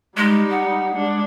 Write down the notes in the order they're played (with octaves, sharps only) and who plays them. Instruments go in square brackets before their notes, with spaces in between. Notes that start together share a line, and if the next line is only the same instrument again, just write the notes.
[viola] G3 D#4 [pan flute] G#3
[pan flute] F#5
[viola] G#3 D4